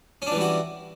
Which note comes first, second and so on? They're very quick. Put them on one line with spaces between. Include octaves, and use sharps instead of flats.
C#4 D4 E3 G3 F#4